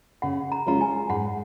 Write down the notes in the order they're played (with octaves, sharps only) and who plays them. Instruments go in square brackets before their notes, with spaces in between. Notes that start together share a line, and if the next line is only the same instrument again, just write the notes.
[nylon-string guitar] C#3 [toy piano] F#5
[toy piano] A#5
[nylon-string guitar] G#3 C#4 F4 [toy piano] A#5
[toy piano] G#5
[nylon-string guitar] G#2 [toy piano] F#5